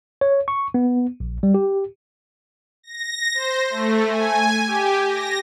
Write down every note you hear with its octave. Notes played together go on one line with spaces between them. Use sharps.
C#5
C#6
B3
A#1
G3
G4
A#6
C5
A3
G#5
G4
A#6